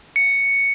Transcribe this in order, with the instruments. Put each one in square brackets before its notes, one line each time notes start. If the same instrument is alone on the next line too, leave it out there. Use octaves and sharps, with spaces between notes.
[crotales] C#7